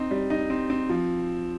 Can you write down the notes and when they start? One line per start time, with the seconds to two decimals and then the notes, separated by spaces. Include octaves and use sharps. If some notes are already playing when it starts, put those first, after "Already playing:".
Already playing: C4 D#4
0.11 G3
0.30 D#4
0.50 C4
0.70 C4
0.89 F3